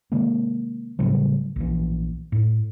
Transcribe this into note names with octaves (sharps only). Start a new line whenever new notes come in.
C3 D#3 G#3 A#3
A2 C#3 F#3 G3
A#1 E3
A2